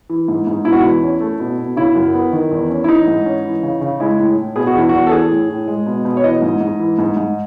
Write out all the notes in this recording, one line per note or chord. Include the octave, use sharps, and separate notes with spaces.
E3
G#2
G#2
B2 E4
F#4
E2 E4
C#4
A3
B2
B2
C#3 E4
F#2
B3
D#3
E2
C#4
E4
E3 D#4
G#2
C#4
E3
C#3
C#3
G#3 E4
A2
A2
B2 G#4
F#4
E2 E4
E2 F#4
A4
E3 G#4
A2
A2
G#3
B2
B2
C#5
E3 D#5
G#2
G#2
E3
G#2
G#2